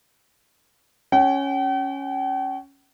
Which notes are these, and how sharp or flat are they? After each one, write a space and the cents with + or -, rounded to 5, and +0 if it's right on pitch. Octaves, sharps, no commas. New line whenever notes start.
C#4 +0 G5 -45